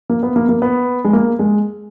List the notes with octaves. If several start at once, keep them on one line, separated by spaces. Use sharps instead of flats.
A#3
B3
A#3
A#3
B3
G#3
A#3
G#3